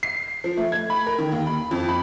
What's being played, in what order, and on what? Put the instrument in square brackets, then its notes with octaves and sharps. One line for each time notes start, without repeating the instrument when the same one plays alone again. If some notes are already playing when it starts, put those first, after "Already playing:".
[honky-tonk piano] C7
F3
A3
G#6
B5
A#4
D#3
D#2
B5
F2
B5